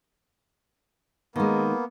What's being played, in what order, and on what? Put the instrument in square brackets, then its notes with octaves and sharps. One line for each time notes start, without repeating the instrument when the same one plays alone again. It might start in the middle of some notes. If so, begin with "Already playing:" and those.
[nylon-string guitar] D#3 G#3 [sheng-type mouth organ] A#3 B3